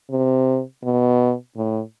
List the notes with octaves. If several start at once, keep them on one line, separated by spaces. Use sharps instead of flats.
C3
B2
A2